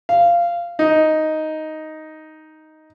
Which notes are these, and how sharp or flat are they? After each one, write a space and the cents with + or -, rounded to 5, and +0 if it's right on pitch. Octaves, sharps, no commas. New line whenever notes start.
F5 -15
D#4 +5